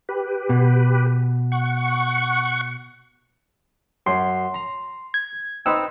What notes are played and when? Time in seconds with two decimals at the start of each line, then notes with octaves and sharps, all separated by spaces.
0.09 G4 B4
0.49 B2
1.52 F#5 C#6
4.07 F#2 C6
4.54 A#5
5.14 G#6
5.66 C4 D#4 B4 E6